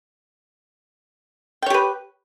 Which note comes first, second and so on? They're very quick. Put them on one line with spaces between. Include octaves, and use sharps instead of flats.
G5 C#5 G4 B4